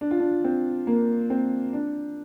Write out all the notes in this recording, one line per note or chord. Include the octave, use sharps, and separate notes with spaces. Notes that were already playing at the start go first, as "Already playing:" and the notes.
D4
F4
D4
C4
A#3
C4
D4